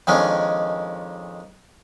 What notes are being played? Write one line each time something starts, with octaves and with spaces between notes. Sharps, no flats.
F2 D#3 G#3 C#4 D4